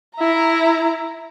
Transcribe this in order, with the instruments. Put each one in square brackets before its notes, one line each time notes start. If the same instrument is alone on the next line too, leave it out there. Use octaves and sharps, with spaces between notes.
[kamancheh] E4 A#5